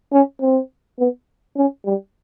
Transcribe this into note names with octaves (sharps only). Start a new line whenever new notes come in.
C#4
C4
B3
C#4
G3